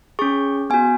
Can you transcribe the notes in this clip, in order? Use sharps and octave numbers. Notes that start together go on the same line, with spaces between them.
C#4 G#4 C#6
B3 F#4 G#5